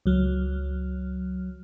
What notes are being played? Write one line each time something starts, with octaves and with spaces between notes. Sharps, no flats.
C#2 F#3 F6